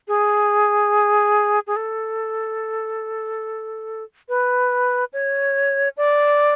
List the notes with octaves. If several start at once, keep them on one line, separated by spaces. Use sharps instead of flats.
G#4
G#4
A4
B4
C#5
D5